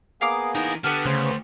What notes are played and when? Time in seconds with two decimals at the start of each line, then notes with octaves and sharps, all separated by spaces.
0.21 A#3 B3 G#4 F5 A#5 D6
0.55 E3 D#4 A#4
0.84 D3 B3 G4 B4 F#5 A5 F6
1.06 D2 C#3 C5